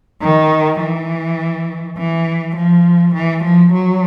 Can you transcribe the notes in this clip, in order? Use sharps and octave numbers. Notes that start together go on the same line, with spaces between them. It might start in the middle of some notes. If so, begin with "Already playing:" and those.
D#3
E3
E3
F3
E3
F3
F#3